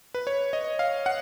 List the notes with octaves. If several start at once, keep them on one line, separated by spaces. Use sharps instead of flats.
B4
C#5
D#5
F5
F#5